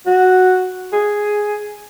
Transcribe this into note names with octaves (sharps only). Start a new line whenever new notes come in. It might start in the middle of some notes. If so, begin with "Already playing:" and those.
F#4
G#4